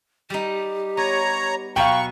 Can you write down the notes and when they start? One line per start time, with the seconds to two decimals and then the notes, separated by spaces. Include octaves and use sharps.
0.30 G3 D#4 G4
0.97 B3 C#5 A#5
1.76 B2 F#3 F5 G5 A#5 B5 C#6